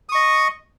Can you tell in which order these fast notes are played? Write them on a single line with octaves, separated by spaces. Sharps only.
D#6 C#6 D#5